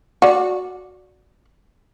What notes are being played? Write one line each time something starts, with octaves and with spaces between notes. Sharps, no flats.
F#4 D5